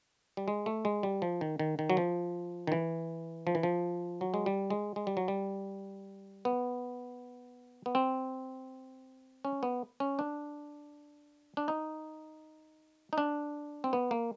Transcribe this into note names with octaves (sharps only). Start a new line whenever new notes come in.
G3
G#3
A3
G#3
G3
F3
D#3
D#3
D#3
F#3
F3
D#3
E3
F3
E3
F3
F#3
G#3
G3
G#3
G#3
G3
F#3
G3
B3
B3
C4
C#4
B3
C#4
D4
D4
D#4
D#4
D4
C4
B3
A#3